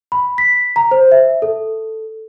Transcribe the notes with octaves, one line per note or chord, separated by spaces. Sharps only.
B5
B6
A#5
C5
E5
A4